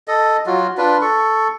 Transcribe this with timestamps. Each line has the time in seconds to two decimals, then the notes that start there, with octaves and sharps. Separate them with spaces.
0.08 A4 D#5
0.46 F#3 F4 F#4
0.77 D4 F4 B4
1.01 A4 C#6